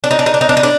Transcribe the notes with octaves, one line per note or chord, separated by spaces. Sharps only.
D4
D#4
D4
D#4
D4
D#4
D4
D#4
D4